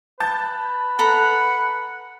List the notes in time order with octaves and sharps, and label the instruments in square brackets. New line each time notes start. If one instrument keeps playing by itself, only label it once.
[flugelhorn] B4 [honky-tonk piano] A5 G6 A6
[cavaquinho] A4 A#5 B5 [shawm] F#5